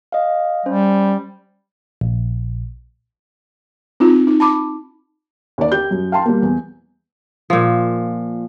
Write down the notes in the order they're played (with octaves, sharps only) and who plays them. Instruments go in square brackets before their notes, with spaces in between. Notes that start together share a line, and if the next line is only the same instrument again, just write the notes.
[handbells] D#5 F5
[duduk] G3 [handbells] C#4 C5
[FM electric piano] A#1
[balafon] C4 D#4 F4
D#4
A5 B5 D6
[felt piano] D#2 D5
G4 G6
F#2
F5 G5 A5 C6
G3 A#3
E2
[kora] A#2 F3